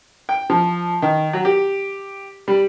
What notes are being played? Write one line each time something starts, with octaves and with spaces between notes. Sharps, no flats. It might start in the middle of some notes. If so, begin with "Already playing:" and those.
G5
F3
D#3
F#3
G4
G3